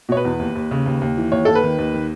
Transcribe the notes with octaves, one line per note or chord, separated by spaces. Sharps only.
B2 C#5
B4
E2
D#2
D#2
C#3
D#2
D#2
E3
D#2 C#5
D#2 A4
B4
D#3
D#2
D#3